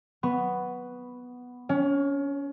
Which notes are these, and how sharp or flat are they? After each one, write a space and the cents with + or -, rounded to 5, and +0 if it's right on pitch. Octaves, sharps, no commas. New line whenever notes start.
B3 +0 C#6 +10
C#4 +30 C#5 -10